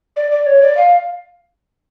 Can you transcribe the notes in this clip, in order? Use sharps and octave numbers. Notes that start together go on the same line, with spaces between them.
D5
D5
C#5
D5
F5